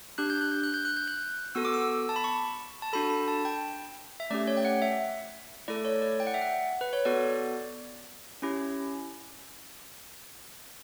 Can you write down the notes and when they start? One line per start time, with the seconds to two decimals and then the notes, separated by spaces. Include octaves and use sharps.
0.18 D4 G4 F#6
0.30 G6
0.41 F#6
0.52 G6
0.64 F#6
0.74 G6
0.85 F#6
0.97 G6
1.08 F#6
1.55 B3 F#4 A4 E6
1.65 D6
1.74 E6
2.09 A5
2.16 B5
2.24 C#6
2.82 A5
2.93 D4 F#4 A4 B5
3.10 B5
3.28 A5
3.45 G5
4.20 E5
4.30 A3 C#4 G4 D5
4.47 C#5
4.57 G5
4.65 F#5
4.82 E5
5.68 A3 E4 A4 D5
5.85 C#5
6.02 D5
6.20 G5
6.27 F#5
6.34 E5
6.41 F#5
6.81 B4
6.93 C#5
7.05 B3 F#4 A4 D5
8.42 C#4 E4 G4